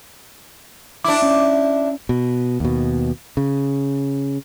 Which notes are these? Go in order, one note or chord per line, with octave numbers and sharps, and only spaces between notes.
D4 E4 D6
C#4
B2
D#2 B2
C#3